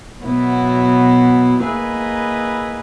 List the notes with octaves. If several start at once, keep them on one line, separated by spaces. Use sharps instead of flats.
B2 F#3 B3 E4
A#3 E4 G#4 B4 D#5